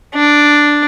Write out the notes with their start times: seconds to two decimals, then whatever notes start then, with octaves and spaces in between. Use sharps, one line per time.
0.15 D4